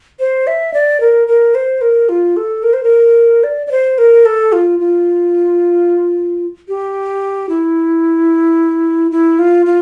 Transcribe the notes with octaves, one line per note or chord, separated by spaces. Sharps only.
C5
E5
D5
A#4
A#4
C5
A#4
F4
A4
A#4
C5
A#4
D5
D5
C5
A#4
A4
F4
F4
G4
E4
E4
F4
F4